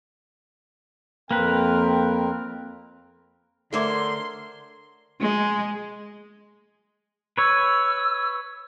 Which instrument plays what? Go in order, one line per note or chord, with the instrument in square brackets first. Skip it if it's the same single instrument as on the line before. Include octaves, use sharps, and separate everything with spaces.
[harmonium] F2 C4 A#4 [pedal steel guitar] A#3 B4 [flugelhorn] G5
[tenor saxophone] D3 [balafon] A3 E5 D6 [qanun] A#4 C5 C#5 [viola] C6
[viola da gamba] G#3
[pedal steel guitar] B4 C#5 [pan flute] E6